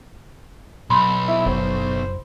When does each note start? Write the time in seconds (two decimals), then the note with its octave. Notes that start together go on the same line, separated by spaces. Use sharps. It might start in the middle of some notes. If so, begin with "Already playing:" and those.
0.90 B1 B5 C6
1.28 E4
1.46 F#1 C5